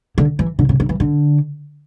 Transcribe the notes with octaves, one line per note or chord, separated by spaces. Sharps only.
D3
E3
D3
C#3
D3
E3
D3